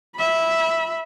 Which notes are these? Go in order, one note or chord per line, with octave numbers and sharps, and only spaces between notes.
E5 B5